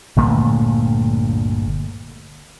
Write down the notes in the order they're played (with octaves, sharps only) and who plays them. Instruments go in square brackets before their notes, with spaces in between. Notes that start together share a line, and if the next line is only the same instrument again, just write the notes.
[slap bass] G1 D2 A#2 A3